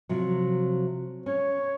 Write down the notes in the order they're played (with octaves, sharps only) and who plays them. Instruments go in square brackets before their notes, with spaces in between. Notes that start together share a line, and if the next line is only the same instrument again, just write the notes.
[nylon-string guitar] C3 F3 F#3
[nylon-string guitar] C#4 [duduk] C#5